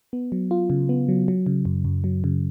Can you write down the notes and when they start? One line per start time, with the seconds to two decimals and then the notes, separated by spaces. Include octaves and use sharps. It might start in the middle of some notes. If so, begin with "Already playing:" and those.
0.13 B3
0.32 F#3
0.51 F4
0.70 C#3
0.89 B3
1.09 F#3
1.28 F#3
1.46 C#3
1.65 F#2
1.85 F#2
2.04 F#3
2.24 C#3